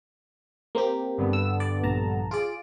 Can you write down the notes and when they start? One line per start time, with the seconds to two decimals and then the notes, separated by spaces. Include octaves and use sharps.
0.75 A#3 C4 G4
1.18 G2 D3 B3
1.33 E6
1.60 D5
1.83 A#1 A5 A#5
2.31 F4 G#4 D5 D7